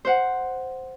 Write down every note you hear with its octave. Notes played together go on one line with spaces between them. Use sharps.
C5 F#5